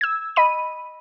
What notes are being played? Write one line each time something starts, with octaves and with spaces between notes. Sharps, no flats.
E6 G#6
D#5 B5 D#7